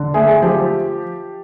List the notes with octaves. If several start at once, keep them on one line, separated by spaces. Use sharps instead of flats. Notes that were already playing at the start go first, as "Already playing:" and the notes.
Already playing: D3
A3 G#4
F3 G4